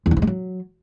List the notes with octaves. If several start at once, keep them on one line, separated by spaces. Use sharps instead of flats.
E2
D3
E3
G#3
F#3